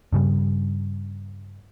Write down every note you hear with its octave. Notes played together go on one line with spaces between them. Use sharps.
G2 C#3 G3